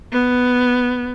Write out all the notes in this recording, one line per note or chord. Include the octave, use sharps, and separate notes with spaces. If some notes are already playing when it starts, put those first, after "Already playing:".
B3